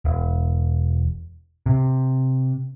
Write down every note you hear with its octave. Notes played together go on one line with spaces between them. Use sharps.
E1
C3